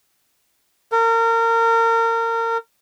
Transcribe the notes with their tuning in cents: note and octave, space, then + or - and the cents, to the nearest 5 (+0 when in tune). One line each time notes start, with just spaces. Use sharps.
A#4 -30